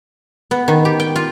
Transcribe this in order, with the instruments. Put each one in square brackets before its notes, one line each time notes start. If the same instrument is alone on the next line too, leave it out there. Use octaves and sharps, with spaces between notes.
[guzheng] B3
D#3
G4
G5
F4